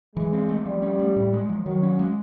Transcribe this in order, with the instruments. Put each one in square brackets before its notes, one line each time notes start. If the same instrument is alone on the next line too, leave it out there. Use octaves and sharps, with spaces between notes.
[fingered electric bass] E3 [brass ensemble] G#3
[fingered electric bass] C4
A3
[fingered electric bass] F3 [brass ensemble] G3
[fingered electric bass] C#4
A3
A2
G#3
F3
[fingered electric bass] D#3 [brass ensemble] F#3
[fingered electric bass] C#4
G#3